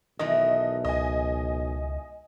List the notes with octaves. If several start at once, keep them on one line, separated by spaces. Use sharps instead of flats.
B1 D#3 E3 A3 D#5
C#2 D#5 G#5